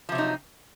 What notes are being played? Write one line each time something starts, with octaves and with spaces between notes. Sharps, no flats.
C3 F3 F#3 D#4